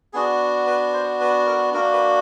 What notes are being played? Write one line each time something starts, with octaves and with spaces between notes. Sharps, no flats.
B3 D4 F#4 G#4
B4
C5
B4
A#4
A#3 D4 F#4 A#4
B4